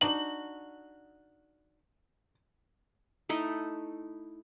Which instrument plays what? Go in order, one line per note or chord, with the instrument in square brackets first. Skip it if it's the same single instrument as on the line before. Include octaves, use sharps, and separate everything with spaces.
[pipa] D4 D#4 F#4 [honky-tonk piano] F#7
[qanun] A3 D#4 E4 D#5